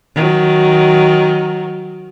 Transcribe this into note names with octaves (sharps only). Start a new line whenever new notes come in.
D#3 F#3